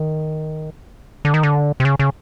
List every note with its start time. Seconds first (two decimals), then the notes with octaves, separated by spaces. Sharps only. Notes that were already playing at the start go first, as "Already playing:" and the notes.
Already playing: D#3
1.25 D3
1.34 D#3
1.43 D3
1.80 C3
1.85 C#3
1.99 C#3